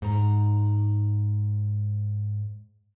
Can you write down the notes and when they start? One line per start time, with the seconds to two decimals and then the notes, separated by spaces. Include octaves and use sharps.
0.02 G#2 A#5